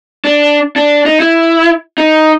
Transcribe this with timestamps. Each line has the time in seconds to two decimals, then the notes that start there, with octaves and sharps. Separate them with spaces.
0.25 D4
0.76 D4
1.06 D#4
1.20 E4
1.98 D#4